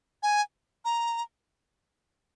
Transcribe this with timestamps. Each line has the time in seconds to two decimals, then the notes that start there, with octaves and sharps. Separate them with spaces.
0.23 G#5
0.85 A#5